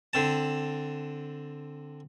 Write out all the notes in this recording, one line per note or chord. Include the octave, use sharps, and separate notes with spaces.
D3 C4 A5